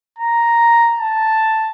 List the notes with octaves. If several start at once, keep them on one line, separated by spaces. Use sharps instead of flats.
A#5
A5